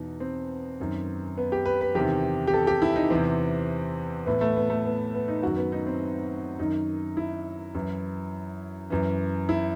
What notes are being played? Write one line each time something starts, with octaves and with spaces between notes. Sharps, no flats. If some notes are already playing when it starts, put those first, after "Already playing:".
Already playing: E2 B2 D#4
C4
F#2 D#3
B3
G4
B4
B4
E2 C3 D#3 G4
G4
A4
G4
E4
D#4
E2 C3 E3 C4
A2 E3 B3
A3
B3
A3
B3
B3
D#4
F#2 D#3 F#4
B3
D#4
C4
F#2 D#3 D#4
E4
F#2 E3
F#2 E3
E4